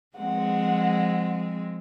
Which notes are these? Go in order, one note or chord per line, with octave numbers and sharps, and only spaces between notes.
F3 G#3 C4 F#5